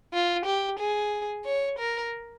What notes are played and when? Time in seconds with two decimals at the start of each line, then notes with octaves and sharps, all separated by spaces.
0.13 F4
0.46 G4
0.79 G#4
1.45 C#5
1.78 A#4